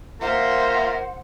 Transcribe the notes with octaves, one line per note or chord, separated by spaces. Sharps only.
A#3 F4 C5 E5 F#5 A#5